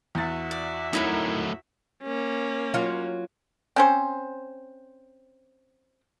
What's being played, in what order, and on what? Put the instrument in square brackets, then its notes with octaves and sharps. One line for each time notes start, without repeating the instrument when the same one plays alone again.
[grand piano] E2 A6 [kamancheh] F#4 E5
[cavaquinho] D5
[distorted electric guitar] A2 F#3 [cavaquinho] D#4 E4 A#4
[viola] A#3 C#4
[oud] F#3 F4
[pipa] C4 C#4 C5